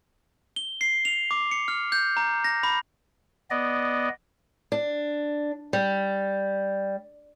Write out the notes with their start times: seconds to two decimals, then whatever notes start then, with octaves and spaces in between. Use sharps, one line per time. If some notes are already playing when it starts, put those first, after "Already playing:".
0.56 G7
0.81 C7
1.05 F7
1.31 D6
1.51 C#7
1.68 F6
1.92 G6
2.17 A#5
2.44 A#6
2.63 B5
3.51 B3 D5 D#5
4.72 D4
5.73 G3